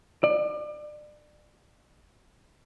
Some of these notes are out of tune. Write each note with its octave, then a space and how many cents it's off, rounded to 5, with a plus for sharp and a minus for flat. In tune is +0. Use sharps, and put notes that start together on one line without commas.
D5 +30